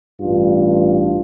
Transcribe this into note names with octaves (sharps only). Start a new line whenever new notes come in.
A1 G2 F4